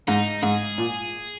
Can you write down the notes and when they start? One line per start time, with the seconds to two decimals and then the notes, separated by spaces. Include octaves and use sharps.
0.08 G#2 D#4
0.43 G#2 G#4
0.78 A#2